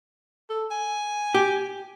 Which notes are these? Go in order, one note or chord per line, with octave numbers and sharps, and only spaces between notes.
A4
G#5
G4